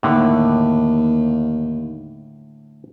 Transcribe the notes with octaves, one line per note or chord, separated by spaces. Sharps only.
D#2 A2 D3